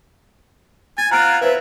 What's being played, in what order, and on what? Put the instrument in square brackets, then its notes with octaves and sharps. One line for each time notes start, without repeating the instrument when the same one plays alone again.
[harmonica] G#5 [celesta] A6
[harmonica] C4 F4 F#5 [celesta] A#5 F6 D7
[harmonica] E4 [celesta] B4 C5